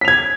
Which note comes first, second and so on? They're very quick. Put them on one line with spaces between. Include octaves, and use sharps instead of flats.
B6 F7 G#6